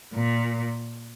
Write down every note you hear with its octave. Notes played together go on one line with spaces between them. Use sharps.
A#2